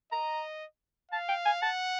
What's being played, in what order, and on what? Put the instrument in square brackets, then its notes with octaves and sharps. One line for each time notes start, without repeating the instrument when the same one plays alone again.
[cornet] D#5 [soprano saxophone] A#5
[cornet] F5 [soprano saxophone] A5
[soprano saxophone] G5
G#5
[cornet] F#5 [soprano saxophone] A5